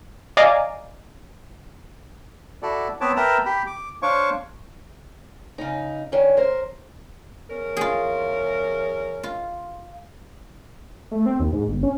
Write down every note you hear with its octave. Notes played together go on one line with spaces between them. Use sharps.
D5 D#5 F5 G#5 A#5 D6
E4 F#4 A4 D5
B3 C4 B4 C#5 A5 D6
A#4 B4 E5 G5 A5 A#5
G4 G5 B5
D6
D4 C5 C#5 F5 C#6 D6
C#3 D#4
D#3 C#4 D4
A#4 C5
E2 C#4 A#4
F4 G#4
F4
A3
C4
D#2
G#2
G1
C#4